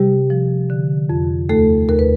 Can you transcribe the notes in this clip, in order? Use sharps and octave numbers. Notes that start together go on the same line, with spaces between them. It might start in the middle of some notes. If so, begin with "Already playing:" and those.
Already playing: C3 G3 G4
F3
D3
F2
D#2 A3 A4
D#2 A#4
B4